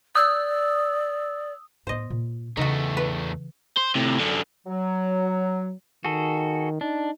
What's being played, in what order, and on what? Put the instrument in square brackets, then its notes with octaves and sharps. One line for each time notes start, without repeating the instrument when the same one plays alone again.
[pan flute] D5 [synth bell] D#6 E6
[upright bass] A2 B3 [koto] C5 D#5
[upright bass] A#2
[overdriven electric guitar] E2 A3 [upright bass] C#3 E3 [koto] D#4 F#4
[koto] B4
[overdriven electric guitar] C5
A2 C3
F#2 D3
[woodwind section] F#3
[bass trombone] D#3 [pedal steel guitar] F#4 G#4 A4
[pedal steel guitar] D4 [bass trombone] D#4